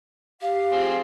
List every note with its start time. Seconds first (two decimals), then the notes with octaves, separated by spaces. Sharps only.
0.41 G4 F5
0.72 F3 C4 G#4